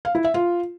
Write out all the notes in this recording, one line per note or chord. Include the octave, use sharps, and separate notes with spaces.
F5
E4
E5
F4